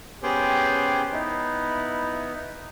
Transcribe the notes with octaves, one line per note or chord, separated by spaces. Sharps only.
B3 C#4 G4 G#4 C5 G5
B3 D#4 E4